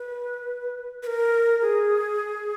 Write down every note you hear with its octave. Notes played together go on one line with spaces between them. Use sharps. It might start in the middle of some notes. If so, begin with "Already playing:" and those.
Already playing: B4
B4
A#4
G#4